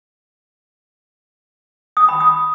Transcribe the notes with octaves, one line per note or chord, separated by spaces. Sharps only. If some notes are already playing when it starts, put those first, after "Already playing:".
D#6
B5
D#6